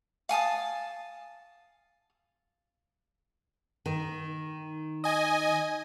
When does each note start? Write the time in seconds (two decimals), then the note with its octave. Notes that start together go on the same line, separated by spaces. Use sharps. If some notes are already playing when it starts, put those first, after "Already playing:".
0.29 F5 G#5 A5 D#6
3.86 D#3
5.04 D#5 G#5